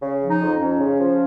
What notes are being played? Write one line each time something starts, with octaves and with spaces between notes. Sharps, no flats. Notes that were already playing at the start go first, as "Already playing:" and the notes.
C#3
F3
D#4
F2
C#4
F2
C#3
F3